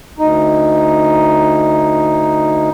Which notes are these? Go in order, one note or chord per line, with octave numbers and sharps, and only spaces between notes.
D2 D#4